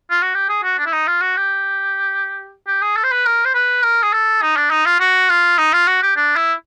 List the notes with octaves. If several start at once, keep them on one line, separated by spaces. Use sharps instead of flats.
F4
F#4
G4
G#4
F#4
D4
E4
D#4
F4
F#4
G4
G4
G#4
A4
C5
B4
A#4
C5
B4
A#4
G#4
A4
D#4
D4
D#4
F4
F#4
F4
D#4
F4
F#4
G4
D4
E4